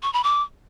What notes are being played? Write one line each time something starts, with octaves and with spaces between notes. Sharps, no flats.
C#6
B5
D6